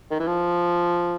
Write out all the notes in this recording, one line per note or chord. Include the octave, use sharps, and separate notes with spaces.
D#3
E3
F3